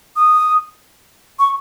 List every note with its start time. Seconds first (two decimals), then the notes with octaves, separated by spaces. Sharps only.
0.16 D#6
1.39 C#6